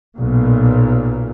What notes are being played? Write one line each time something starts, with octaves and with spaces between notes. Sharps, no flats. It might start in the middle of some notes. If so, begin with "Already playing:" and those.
B1 A#2